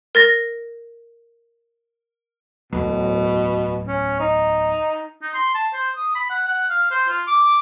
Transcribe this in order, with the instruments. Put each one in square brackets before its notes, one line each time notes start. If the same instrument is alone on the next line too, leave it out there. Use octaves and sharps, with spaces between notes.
[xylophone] A#4 A6 A#6
[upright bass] D1 E2 [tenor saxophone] B2
[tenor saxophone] C#4
D#4
[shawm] D#4
C6
A5
C5
D#6
B5
F#5
F#5
F5
C5
F4
D6